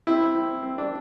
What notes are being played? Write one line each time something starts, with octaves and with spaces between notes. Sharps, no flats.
C4 E4
C4
C4
D4